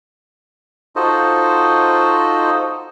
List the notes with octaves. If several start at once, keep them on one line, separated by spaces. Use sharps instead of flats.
D#4 F4 F#4 A4 C5 D#5